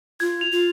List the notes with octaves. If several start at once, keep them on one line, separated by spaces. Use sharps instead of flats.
F4 G#6
F7
F4